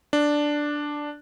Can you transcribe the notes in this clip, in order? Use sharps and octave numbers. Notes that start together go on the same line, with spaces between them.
D4